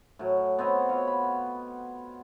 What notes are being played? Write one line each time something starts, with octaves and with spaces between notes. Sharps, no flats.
A2 F#3
B3 C4 C#5 D#5
F4 F#4 C#5
B5